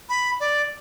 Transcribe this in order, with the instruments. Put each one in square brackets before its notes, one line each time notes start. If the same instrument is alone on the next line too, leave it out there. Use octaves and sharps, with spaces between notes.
[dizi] B5
D5